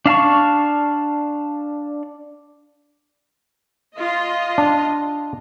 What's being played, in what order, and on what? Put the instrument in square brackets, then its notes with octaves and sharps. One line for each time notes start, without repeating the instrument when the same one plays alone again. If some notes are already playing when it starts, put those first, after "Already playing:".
[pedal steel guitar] D4 F5 A5 C#6
[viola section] F4 D#5
[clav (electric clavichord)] D4